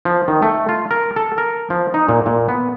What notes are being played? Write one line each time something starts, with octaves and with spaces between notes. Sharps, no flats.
F3
D#3
A3
F4
A#4
A4
A#4
F3
D#4
A#2
A#2
B3